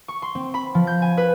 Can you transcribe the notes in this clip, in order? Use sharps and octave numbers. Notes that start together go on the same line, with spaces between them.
C#6
C6
C4
B5
F3
G6
G#5
B4